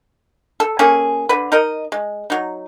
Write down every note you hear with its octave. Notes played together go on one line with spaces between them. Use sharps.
A4
A#3 C#4 G#4 A4
D3 B4
D#4 A#4 D#5
G#3
F#3 D#4